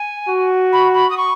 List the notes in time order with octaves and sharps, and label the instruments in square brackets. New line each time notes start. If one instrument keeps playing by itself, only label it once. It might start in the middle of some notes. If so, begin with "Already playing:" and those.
Already playing: [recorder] G#5
[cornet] F#4
[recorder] B5
B5
D#6
C#6